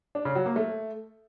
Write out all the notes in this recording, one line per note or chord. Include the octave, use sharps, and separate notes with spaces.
D4
C#3
F#3
A#3
A3